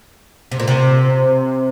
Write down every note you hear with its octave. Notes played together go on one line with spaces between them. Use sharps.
C3
A#2
C3